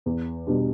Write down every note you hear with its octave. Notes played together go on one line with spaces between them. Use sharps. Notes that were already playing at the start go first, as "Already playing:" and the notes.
E2
B2 G3 D4